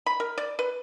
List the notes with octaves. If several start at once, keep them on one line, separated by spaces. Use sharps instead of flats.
B5
A#4
D5
B4